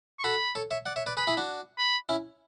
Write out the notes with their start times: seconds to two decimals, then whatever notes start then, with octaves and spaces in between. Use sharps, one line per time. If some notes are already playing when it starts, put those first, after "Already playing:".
0.19 C#6
0.24 F#4 A4 B5
0.55 A4 C#5
0.71 C#5 E5
0.86 D5 F#5
0.96 C#5 E5
1.06 B4 D5
1.17 G#4 B4 B5
1.27 E4 G#4
1.37 D4 F#4
1.78 B5
2.09 C#4 E4